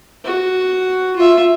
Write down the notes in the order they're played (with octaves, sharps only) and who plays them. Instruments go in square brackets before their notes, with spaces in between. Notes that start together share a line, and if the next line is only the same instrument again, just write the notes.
[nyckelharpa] F#4
F4 E5